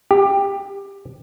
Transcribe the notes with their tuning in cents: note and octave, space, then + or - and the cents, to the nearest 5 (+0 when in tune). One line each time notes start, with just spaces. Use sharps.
G4 +15